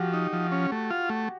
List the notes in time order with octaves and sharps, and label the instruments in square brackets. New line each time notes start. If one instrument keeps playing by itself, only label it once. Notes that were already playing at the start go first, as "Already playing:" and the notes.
Already playing: [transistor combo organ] F3 [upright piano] F#4 G4
[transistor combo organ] D#4
F3
C#4
A3
F4
A3